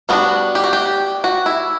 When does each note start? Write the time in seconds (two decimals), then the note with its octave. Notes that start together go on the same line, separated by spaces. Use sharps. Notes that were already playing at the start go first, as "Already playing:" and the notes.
0.09 G3 B3 D4 F#4
0.55 G4
0.64 F#4
0.73 G4
1.24 F#4
1.46 E4